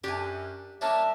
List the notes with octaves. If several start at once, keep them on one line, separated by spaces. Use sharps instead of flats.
F#2 D4 G4 G#5
G3 A#3 C#4 D4 E5 A5